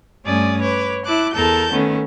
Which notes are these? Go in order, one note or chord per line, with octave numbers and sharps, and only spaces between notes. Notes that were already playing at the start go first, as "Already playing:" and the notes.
G2 A3 C#4 D5 G#5 D#6
B4 C#5 D6
E4 A5 D6 F#6
E2 A4 A#4 A5 G6
D#3 A3 B3 C#4